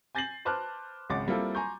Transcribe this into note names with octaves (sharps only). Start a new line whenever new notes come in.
G#5 G6 A6 A#6 C7 F#7
B4 C5 A5 D6 F6 F#6
G#1 C#2 C#4 F#5 D6 A6
G3 A#3 C4 E4 F4 A4
G#5 A#5 C6 C#6 G6